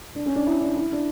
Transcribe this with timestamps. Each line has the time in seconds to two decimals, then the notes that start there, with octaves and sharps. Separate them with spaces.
0.15 D4
0.26 C#4
0.35 D4
0.46 E4
0.61 D4
0.77 E4
0.92 D4